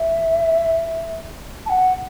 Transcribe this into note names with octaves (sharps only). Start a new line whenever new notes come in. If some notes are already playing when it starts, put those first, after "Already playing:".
Already playing: E5
A5
F#5